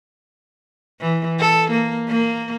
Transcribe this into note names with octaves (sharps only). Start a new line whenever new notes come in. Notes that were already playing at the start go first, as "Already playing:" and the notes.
E3
A4
A#3
A#3